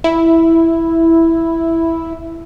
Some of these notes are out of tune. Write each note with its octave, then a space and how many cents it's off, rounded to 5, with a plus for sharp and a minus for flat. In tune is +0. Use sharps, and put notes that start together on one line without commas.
E4 +0